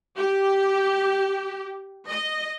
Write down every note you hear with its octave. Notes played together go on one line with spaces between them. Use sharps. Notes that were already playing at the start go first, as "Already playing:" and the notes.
G4
D#5